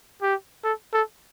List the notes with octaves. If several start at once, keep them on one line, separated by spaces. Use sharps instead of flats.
G4
A4
A4